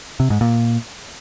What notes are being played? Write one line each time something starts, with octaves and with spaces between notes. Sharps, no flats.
C3
G#2
A#2